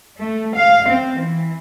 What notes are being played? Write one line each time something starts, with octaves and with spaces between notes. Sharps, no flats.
A3
F5
C4
E3